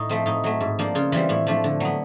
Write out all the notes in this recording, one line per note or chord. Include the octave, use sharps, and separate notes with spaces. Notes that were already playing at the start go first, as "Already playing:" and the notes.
Already playing: A2 D#4
F3 A3 C4
A2 D#4
F#3 A3
G#2
F3 A#3 D4
C#3 F4
E3 G3 C4 F4
A2 E4
F3 A3 D4
D3
F#3 B3